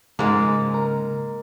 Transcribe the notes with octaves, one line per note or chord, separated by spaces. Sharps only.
G#2 C#3 G#3 A#3
A#4